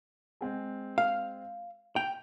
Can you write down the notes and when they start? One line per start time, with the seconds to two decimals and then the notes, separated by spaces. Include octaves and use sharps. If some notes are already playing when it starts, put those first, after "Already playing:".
0.41 G#3 C4 G#4
0.98 F5
1.96 G5 F7